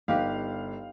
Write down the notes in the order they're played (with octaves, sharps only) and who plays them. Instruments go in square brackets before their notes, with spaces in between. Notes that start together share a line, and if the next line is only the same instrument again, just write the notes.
[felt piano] G1 [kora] D#4 G4 B4 [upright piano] F5